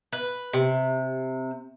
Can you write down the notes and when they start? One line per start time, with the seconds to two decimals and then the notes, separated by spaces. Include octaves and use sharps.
0.13 B4
0.53 C3